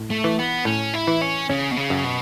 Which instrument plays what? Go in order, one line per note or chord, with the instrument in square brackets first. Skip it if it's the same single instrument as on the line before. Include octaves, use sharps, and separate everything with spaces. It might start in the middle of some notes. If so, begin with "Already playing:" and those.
Already playing: [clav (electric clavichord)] A2
[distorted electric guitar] A3
[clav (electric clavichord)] E3
[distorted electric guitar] B3
[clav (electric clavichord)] A2 [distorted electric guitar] C#4
[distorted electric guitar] E4
[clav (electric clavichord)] E3
[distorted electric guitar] C#4
[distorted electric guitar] C#3 [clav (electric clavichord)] C#4
[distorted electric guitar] B2
C#3
[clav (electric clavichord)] F#2
[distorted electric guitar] B2